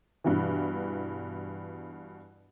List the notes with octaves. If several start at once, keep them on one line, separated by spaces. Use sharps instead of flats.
G2 B2 E3